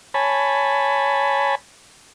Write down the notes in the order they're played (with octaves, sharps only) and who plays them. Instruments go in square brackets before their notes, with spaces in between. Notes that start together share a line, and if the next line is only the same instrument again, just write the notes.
[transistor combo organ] C#5 G#5 A5 B5